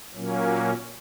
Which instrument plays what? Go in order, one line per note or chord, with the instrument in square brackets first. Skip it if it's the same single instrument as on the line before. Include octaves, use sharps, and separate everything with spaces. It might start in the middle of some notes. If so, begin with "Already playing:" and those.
[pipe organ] A#2 F#3 A#3 C#4